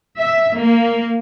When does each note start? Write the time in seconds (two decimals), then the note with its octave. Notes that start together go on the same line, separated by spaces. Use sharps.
0.18 E5
0.58 A#3